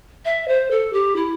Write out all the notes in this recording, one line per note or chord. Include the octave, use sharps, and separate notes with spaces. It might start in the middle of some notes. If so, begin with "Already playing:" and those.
E5
C5
A4
G4
E4